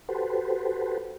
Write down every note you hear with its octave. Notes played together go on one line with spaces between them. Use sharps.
F#4 G4 A4 B4 C5